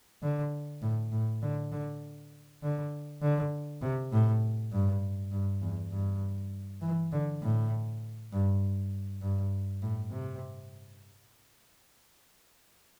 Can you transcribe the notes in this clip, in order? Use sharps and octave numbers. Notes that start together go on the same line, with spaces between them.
D3
A2
A2
D3
D3
D3
D3
C3
A2
G2
G2
E2
G2
E3
D3
A2
G2
G2
A2
C3